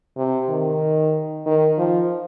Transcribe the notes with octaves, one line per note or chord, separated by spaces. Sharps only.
C3
D#3
D#3
F3